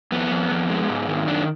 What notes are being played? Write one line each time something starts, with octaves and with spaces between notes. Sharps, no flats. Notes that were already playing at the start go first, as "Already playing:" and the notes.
F2 B3
F2
F2
G#3
G#2
D#3
F#2 D4